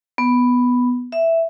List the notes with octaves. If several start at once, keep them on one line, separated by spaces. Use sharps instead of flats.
B3
E5